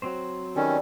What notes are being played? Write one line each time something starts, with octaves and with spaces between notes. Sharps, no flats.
F#3 C4 C5
D#3 G3 C#4 A4